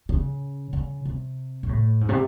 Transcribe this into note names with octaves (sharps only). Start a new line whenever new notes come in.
C#3
C#3
C3
C3
A2
G#2
C3